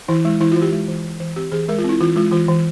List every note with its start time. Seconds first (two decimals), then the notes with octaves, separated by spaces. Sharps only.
0.08 E3 E4
0.25 G#3 E4
0.40 E3 E4
0.52 E3 F4
0.62 G4
0.72 G#3
0.88 E3
1.04 E3
1.20 E3
1.36 C4 G4
1.52 E3 G#4
1.68 G#3 A#4
1.79 F4
1.84 C4 E4
2.01 E3 F4
2.16 G#3 F4
2.31 E3 F4
2.48 E3